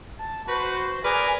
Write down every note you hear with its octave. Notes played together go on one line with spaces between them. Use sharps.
A5
F#4 B4 C5
G#4 A#4 B4 D5 G#5